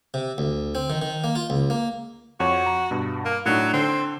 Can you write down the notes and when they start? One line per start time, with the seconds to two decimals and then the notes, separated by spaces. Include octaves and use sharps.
0.14 C3
0.38 D2
0.75 C4
0.90 D#3
1.02 D#3
1.24 A#3
1.35 F4
1.50 C#2
1.70 A#3
2.40 F2 F#4 C#5 C#6
2.66 A#5
2.91 G2 B2
3.25 A#3
3.46 A2 F#3 D4 D#4
3.73 D3 C4